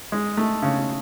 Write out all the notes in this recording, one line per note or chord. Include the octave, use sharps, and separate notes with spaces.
G#3
A3
C#3